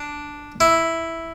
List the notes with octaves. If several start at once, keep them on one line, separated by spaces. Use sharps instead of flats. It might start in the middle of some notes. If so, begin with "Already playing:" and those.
Already playing: D4
E4